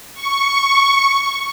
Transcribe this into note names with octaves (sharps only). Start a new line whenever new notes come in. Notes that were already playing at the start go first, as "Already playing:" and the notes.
C#6